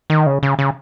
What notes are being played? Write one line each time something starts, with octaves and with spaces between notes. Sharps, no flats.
D#3
C#3
C#3
C#3